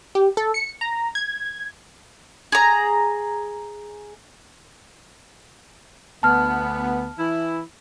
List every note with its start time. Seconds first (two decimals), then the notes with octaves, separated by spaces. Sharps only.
0.15 G4
0.37 A4
0.54 C#7
0.81 A#5
1.15 G#6
2.52 G#4 A#5
6.23 D2 B3 A5 F6
7.18 E3 E4